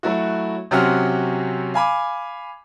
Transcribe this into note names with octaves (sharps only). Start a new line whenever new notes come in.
F#3 A3 E4 F#4
C3 F#3 C4 C#4 F#5 F6
F5 G#5 B5 D6